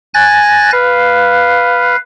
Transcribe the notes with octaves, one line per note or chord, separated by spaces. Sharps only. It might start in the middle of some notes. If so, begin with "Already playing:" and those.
G#5 F#6 A6 A#6
B4 F5